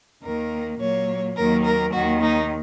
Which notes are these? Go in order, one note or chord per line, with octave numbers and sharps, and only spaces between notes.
D#2 D#3 A#3 A#4
A#2 F#3 A#3 C#5
D#2 D#3 F#3 A#3 A#4
A#4
D#2 D#3 A#3 F#4
D#4